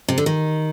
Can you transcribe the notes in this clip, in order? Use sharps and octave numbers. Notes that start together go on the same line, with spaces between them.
C3
D3
D#3